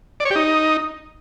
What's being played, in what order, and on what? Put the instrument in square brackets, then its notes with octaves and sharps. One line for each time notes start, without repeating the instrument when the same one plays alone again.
[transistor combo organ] D5
C#5
G4
D#4